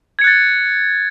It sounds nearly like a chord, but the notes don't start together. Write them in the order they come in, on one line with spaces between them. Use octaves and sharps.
G#6 C#7 F#6 A6